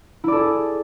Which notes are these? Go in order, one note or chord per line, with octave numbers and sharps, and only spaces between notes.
E4 G#4 A4 D5